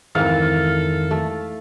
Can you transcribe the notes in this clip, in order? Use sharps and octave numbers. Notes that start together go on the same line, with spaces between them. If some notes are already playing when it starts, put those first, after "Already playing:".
F2 G#2 D#3 E3 A4 A#4 F5
A3